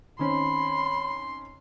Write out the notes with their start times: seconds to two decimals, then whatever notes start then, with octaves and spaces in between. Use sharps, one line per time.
0.19 D#3 C4 C#4 B5 C6